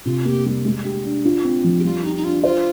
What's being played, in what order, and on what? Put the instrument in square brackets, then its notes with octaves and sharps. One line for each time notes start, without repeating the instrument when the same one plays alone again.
[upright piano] C3 [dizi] F4
[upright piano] A#3 [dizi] G4
[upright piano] G3
G#3
G4
D4
F4
C4
F3
[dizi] G4
[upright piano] G3 [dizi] F4
[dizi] D#4 [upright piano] G4
[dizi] D#4
[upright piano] D4 [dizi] F4
[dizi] F4 [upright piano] C5